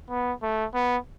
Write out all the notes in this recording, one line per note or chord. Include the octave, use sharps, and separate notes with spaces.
B3
A3
B3